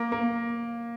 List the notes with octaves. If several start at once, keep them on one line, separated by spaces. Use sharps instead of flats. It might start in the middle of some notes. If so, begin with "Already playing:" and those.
Already playing: A#3
A#3